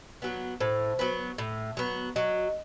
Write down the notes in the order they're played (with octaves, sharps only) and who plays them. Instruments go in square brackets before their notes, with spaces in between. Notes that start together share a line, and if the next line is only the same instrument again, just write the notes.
[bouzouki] F#3 B3
[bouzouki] A2 [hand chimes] C5
[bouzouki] F#3 B3
A2
F#3 B3
[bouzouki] F#3 [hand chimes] D#5